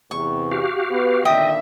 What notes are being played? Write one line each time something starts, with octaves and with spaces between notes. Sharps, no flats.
E2 C3 C#6
F#4 G4 F5
B3 B4
A#2 D3 D#3 D#5 E5 G5 D#6